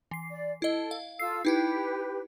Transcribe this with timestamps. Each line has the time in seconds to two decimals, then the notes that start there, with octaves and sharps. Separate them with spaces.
0.11 E3 C7
0.31 D5
0.62 E4 A4 D#5
0.91 F5
1.19 F4 A4 E6 C7
1.45 D#4 E4 G4 B4 G5